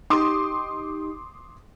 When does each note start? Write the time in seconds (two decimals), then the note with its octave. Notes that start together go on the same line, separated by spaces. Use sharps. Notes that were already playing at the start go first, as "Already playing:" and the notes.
0.10 D#4 G4 C6 D6 D#6